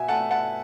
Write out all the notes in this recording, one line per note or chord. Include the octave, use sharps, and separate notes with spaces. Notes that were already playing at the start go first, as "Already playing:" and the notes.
Already playing: B2 E5 G#5
A3 F#5 A5
F#5 A5